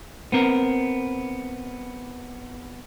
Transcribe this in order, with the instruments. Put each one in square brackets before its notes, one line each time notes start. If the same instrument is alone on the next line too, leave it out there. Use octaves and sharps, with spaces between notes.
[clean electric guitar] B3 C4 A#4